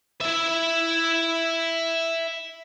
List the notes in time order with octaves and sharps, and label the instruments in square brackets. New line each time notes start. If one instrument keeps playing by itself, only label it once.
[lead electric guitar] E4 E5